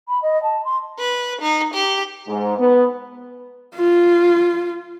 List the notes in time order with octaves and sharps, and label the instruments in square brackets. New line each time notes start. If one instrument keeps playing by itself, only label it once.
[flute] B5
D#5
A5
C6
[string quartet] B4
D#4
G4
[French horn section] G#2
B3
[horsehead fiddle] F4